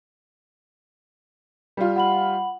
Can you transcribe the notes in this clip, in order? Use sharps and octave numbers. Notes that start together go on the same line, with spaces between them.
G3 F4
F#5 B5 F#7